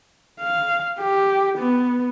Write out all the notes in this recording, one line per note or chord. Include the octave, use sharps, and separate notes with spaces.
F5
G4
B3